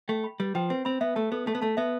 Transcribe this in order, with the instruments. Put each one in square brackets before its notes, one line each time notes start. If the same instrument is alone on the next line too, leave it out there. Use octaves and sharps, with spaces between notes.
[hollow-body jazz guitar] A3 [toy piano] G5
[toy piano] B5
[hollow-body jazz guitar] G3 [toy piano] B4
[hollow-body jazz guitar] F3 [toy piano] G5
[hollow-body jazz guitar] C4 [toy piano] B4
[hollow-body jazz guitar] C4 [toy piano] B5
[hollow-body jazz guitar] B3 [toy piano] E5
[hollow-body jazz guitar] A3 [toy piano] A5
[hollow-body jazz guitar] B3 [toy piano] A4
[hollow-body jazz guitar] A3 [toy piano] A5
[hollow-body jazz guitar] B3
[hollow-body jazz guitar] A3 [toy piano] A5
[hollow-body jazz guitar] B3 [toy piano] E5